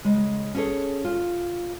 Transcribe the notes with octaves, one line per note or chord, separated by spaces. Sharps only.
C#3 G#3
C#4 E4 G#4 A4 C#5
F4